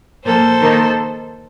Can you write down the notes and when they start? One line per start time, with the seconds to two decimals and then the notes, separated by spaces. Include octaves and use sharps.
0.25 A#2 F3 A#3 A4 C5
0.60 D#3 A#3 D#4